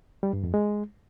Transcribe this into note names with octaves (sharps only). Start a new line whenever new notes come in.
G3
G2
F2
G#3